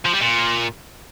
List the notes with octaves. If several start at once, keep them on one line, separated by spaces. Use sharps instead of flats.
F3
G3
A#2